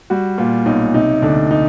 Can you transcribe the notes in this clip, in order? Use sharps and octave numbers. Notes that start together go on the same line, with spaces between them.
G3 F#4
A#2 F4
B1 D#4
C3 D#4
D2 D4
D#4